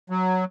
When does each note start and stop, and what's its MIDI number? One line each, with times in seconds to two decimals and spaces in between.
0.10 0.45 54